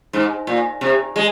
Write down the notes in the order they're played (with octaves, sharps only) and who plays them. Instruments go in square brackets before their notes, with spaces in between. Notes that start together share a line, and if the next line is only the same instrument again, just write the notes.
[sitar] G#2
A#2
C3
G#3